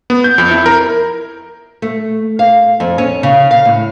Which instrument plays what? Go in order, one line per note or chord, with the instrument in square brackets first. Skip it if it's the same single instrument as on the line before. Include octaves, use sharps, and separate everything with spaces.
[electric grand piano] B3
G6
F2
E4
A#4
[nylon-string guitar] A3
F5
F2
C#4
C#3
F5
A2